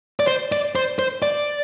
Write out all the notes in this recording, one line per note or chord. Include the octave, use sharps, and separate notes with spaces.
D5
C5
D5
C5
C5
D5